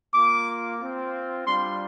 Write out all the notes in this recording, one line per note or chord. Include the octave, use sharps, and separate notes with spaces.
A#3 F4 D6
C4 F4
G3 D4 F4 C6